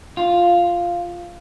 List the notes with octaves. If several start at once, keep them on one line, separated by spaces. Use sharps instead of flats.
F4